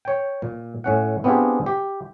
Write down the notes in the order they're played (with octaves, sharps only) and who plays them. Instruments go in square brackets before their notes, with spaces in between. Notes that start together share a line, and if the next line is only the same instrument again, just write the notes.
[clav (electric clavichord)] C#5 G5
A#2
A2 C#4 F#5
B3 C4 D4 F4 G4 G#4
G4